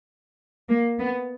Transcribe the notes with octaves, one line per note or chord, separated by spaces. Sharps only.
A#3
B3